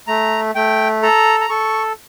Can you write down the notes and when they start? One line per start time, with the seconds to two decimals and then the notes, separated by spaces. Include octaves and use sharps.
0.07 A3 A#5
0.55 A3 G5
1.03 A4 A#5
1.41 A#5
1.50 A4 C#6